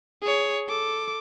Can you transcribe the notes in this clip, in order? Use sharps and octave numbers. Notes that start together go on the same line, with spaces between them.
G#4 C#5
A4 D6